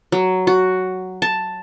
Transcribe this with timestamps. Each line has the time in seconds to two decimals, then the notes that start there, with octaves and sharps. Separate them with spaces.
0.12 F#3
0.47 F#4
1.22 A5